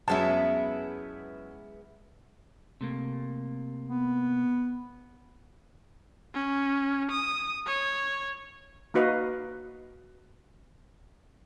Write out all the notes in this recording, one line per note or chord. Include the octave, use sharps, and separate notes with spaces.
F#2 G#3 B3 E4 A5
C3 A3 A#3
B3
C#4
D#6
C#5
A#3 D#4 F#4 B4 D#5 F5